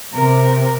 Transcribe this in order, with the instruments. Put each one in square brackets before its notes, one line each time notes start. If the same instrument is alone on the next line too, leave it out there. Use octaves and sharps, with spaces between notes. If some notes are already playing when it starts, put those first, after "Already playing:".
[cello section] C3 [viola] A#4